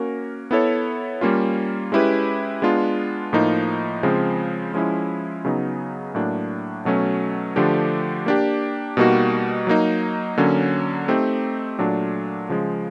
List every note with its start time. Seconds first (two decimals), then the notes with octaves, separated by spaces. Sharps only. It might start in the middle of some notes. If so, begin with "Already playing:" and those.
Already playing: A#3 C#4 F#4 A#4
0.51 B3 E4 A4 C#5
1.21 G3 A#3 C#4 F4
1.92 G#3 C#4 E4 G4 B4
2.62 G#3 B3 D4 F4
3.33 A2 F3 A#3 D#4
4.03 C#3 F3 G#3 C4
4.74 F3 G#3 C#4 E4
5.45 C#3 F#3 B3 D#4
6.15 A2 F#3 A#3 D4
6.85 B2 F#3 A3 C#4
7.56 D3 F3 A3 D4 G4
8.26 A#3 D4 G4
8.97 B2 G3 A#3 D#4 F#4
9.67 F#3 A#3 D#4
10.37 D3 F#3 A#3 C#4
11.08 A3 C4 D#4 G4
11.78 A#2 F#3 A3 D4
12.49 C#3 F3 G#3